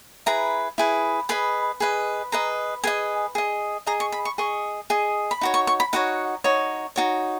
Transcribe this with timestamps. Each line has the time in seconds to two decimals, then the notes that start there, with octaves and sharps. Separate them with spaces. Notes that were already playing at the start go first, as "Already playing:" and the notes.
0.26 E4 G#4 B4 A#5
0.78 E4 G#4 B4
1.29 G#4 B4 D#5 B5
1.80 G#4 B4 D#5
2.32 G#4 B4 D#5 A#5
2.84 G#4 B4 D#5 G#5
3.35 G#4 D#5
3.86 G#4 D#5 A#5
4.00 C#6
4.12 B5
4.25 C#6
4.38 G#4 D#5 C#6
4.90 G#4 D#5
5.31 B5
5.41 D#4 F#4 C#5
5.54 C#6
5.67 C#6
5.80 B5
5.93 D#4 F#4 C#5 F#5
6.44 D#4 F#4 C#5
6.96 D#4 F#4 C#5